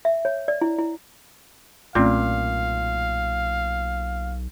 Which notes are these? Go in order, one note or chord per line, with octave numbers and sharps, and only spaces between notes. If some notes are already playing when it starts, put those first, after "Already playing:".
E5
C#5
D5
E4
E4
B1 A#2 A3 C4 C#4 F5